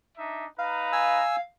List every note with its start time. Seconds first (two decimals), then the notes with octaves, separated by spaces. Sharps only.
0.18 D4 D#4 E5
0.58 D#4 B4 F5 A#5
0.92 G#5 E6